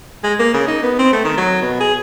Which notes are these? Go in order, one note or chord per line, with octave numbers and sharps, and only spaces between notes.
G#3
A#3
C#3
D#4
B3
C4
A3
D#3
F#3
B2
G#4